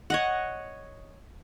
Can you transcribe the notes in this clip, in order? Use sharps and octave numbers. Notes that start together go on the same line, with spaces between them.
C#5 D#5 F#5